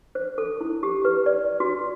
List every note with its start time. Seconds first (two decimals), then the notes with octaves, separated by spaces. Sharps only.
0.15 C5
0.38 A4
0.61 E4
0.83 G4
1.05 B4
1.26 D5
1.60 F#4